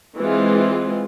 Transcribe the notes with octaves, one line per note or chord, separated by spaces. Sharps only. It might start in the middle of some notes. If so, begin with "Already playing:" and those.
E3 G#3 C4 F4